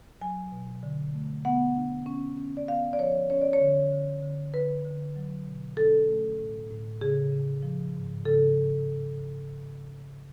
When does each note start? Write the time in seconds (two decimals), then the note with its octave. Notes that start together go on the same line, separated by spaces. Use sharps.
0.21 F#3 G#5
0.52 B2
0.83 D3
1.13 A3
1.45 B3 F#5
1.76 D4
2.06 C#4
2.38 C#4
2.57 D5
2.68 B3 F5
2.93 D5
2.99 F3 C#5
3.30 C#4 C#5
3.41 D5
3.53 C#5
3.61 D3
3.92 D3
4.23 D3
4.54 D3 B4
4.85 D3
5.16 F#3
5.46 B2
5.77 C#4 A4
6.08 A3
6.39 A2
6.71 A2
7.01 C#3 G#4
7.32 C#3
7.63 F3
7.94 G#2
8.25 C#3 A4